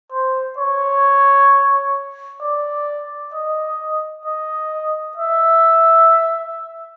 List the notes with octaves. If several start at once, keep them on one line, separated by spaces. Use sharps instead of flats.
C5
C#5
D5
D#5
D#5
E5